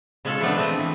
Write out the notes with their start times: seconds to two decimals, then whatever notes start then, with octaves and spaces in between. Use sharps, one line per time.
0.25 C#3 G#3 C#4 F4 A4
0.40 E3 F3 G#3 A3 B3 D4
0.57 A3 C4 D#5
0.79 E3